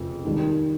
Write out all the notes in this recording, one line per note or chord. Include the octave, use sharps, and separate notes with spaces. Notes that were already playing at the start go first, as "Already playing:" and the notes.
Already playing: F1 F2 C#3 F3 A3
D#2 D#3 G3